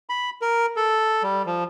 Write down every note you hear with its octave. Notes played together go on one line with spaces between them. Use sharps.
B5
A#4
A4
G3
F3